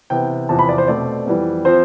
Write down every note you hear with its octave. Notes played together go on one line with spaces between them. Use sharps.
C3 E3 B3 G5
E2 C3 F3 B3 A5
B5
D5
C5
B2 A3 C4 D5
F2 E3 G3 B3
F3 C4 C5